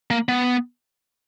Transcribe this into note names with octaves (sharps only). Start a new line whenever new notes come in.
A#3
B3